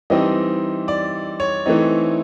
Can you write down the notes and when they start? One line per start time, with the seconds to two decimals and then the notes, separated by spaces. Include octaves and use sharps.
0.10 E3 G3 C4 D#4 D#5
0.88 D5
1.40 C#5
1.66 E3 A3 C4 D#4